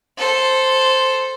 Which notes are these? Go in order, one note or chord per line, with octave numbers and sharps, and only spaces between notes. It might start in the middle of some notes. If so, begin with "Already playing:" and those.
A4 C5